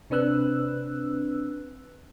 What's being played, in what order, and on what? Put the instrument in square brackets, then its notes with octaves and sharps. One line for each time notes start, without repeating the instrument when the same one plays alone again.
[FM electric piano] C3 C4 D4 B4 E6 F#6